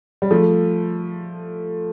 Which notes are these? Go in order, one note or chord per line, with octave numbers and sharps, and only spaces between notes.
G3
F3 A3